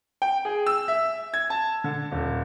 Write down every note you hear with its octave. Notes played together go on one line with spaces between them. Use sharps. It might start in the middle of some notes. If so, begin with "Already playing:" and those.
G5
G#4
E6
E5
G#6
A5
D3
D#1